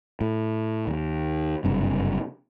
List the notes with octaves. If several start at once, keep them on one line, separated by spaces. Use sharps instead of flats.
A2
D#2
F#1 G2 C3